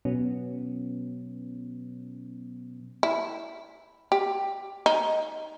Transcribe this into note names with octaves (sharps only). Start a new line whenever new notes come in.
B2 F#3 B3 C#4
E4
G4
D#4